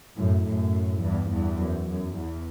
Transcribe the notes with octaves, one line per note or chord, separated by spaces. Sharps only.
F#2 A2
F#2 A2
E2 G2
E2 G2
F#2
F#2
E2